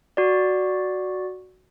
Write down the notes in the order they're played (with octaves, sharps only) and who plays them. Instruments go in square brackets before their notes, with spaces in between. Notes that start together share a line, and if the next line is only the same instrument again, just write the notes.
[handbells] F#4 D5